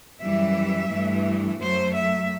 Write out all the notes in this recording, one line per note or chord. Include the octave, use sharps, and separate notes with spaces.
F#2 E3 G3 E5
G2 E3 A3
F#2 F#3 A3 C5
E5